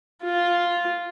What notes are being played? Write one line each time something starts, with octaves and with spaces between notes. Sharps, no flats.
F4